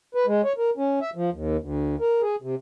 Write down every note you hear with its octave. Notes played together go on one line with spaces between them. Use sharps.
B4
G#3
C#5
A#4
C#4
E5
F3
D#2
D2
A#4
G#4
C3